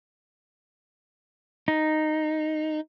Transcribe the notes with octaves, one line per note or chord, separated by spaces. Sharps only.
D#4